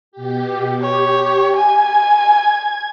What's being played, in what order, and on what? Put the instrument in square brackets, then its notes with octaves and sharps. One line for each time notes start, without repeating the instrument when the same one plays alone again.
[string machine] B2 G4
[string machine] G4 [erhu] C#5
[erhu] G#5 [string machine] G#6